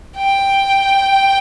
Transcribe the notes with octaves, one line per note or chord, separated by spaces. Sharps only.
G5